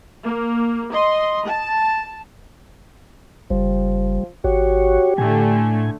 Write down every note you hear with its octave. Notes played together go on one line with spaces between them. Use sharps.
A#3
D#5 C6
A5
F#1 F3 G3
G#1 F#4 G4 C#5
A2 D3 A3 G#5